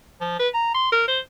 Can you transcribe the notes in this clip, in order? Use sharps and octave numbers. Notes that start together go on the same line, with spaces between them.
F3
B4
A#5
C6
A#4
C5